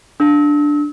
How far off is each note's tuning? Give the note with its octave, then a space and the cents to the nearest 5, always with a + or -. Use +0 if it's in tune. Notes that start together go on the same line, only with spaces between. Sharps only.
D4 +0 E6 -35